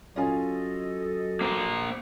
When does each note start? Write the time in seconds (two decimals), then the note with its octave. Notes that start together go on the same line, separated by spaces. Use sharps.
0.16 F#3 C#4 F4 A4 D#5 G#5
1.41 A#3 C5